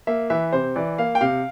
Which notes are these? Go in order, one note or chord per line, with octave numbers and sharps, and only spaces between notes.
A#3 E5
E3 E5
C3 C5
E3 D5
A#3 F5
G5
C3 F5